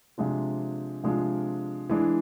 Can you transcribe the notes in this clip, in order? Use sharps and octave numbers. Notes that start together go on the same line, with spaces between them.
C3 F3 G#3 D4 F4
C3 F3 G#3 D4 F4
E3 G#3 D4